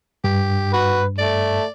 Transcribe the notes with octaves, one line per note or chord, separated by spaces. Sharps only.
G2 G4
F#4 B4
A3 D5